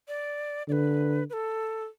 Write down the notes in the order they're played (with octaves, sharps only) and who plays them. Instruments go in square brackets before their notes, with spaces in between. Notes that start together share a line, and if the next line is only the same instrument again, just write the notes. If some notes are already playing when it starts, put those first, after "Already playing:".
[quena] D5
[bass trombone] D3 [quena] D5
[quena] B4
B4
A4